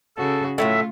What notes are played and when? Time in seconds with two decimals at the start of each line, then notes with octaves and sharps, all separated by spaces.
0.16 C#3 F#4 A4
0.58 A2 E3 F#3 A3 F4 E5